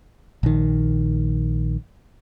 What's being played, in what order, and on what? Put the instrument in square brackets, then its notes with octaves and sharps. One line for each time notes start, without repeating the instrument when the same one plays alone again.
[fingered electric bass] A#1 D#3